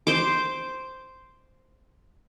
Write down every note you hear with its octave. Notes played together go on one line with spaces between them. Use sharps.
C5 D6